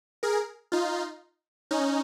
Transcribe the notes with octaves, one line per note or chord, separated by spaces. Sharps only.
G#4 A#4
D#4 F4
C#4 D#4